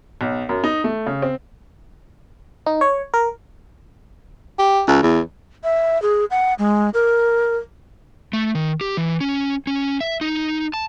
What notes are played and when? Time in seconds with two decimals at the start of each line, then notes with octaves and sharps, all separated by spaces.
0.21 B1
0.49 F#2
0.64 D#4
0.84 A3
1.06 C#3
1.22 C4
2.66 D#4
2.81 C#5
3.14 A#4
4.59 G4
4.88 C#2
5.03 E2
5.64 E5
6.02 G#4
6.31 F#5
6.59 G#3
6.94 A#4
8.33 A3
8.55 D#3
8.81 G4
8.97 E3
9.21 C#4
9.67 C#4
10.01 E5
10.21 D#4
10.74 A5